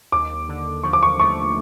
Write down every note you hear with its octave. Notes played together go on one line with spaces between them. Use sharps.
D#2 D6
D3
F3 C#6
D6
C#6
A3 C#6